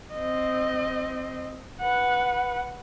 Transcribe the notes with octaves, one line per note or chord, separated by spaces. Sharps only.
C4 D#5
B4 F#5